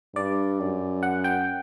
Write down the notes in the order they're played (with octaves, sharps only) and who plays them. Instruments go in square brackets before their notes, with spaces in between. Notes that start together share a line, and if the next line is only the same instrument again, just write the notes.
[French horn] G2 [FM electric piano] D5
[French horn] F#2
[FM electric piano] F#5
G5